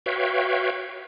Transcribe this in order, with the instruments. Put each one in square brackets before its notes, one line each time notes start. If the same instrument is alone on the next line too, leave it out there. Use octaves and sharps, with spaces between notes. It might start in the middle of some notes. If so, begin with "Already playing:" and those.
[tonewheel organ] F#4 B4 C#5 E5 F5 G5